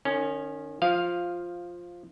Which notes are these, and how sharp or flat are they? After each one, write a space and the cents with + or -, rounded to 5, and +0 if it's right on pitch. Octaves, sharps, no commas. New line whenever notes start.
D#3 -30 C#4 +0
F3 +5 F5 +0